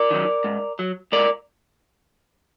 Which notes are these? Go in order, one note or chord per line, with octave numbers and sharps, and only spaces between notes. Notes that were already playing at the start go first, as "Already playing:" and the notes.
Already playing: A#4 D5
D#3 F#3
G#2
F#3
G#2 A#4 D5